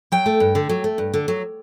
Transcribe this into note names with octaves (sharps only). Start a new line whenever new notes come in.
F#3 G5
A3
G2
D3
F#3
A3
G2
D3
F#3